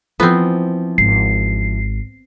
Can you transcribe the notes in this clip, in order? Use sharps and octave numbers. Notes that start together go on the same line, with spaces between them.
E3 F3 B3 C4
G#1 C7